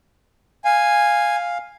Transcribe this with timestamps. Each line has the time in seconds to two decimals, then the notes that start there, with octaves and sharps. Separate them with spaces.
0.65 F5 G#5